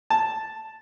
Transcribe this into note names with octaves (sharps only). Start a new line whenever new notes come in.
A5